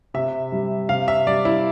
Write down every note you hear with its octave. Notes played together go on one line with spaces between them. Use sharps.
C3 E5
G3
C3 F5
E5
G3 D5
E4